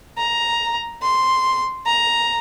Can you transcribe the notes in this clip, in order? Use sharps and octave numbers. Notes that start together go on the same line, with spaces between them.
A#5
C6
A#5